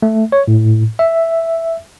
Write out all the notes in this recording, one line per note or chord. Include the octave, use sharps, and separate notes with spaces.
A3
C#5
A2
E5